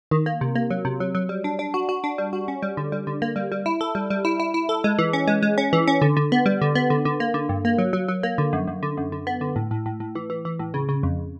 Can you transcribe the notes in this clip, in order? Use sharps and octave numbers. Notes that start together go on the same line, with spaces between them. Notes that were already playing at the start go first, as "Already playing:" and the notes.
D#3
A#3
C3
A#3
F#3
C3
F#3
F#3
G3
D4
D4
F#4
F#4
D4
G3
F#4
C#4
G3
D3
G3
D3
A#3
G3
G3
E4
A4
G3
G3
E4
E4
E4
A4
G#3
E3
C#4
G#3
G#3
C#4
E3
C#4
D3
D3
B3
G3
D3
B3
D3
D3
A#3
D3
G2
A#3
F#3
F#3
F#3
A#3
D3
F#2
F#2
D3
F#2
D3
B3
D3
A2
A2
A2
A2
E3
E3
E3
A2
C#3
C#3
F2